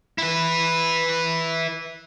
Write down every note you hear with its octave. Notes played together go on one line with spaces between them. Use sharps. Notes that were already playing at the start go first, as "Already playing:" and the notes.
E4 B4